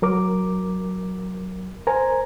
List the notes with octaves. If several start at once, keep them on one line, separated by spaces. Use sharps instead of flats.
F#3 A#4 D6
A#4 C5 G#5 A#5